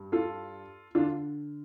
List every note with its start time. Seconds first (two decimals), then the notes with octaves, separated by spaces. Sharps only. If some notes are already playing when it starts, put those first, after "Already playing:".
Already playing: G2
0.12 F4 A4
0.95 D3 D4 F4